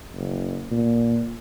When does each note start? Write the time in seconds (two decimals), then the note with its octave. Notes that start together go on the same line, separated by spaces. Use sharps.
0.14 F#1
0.71 A#2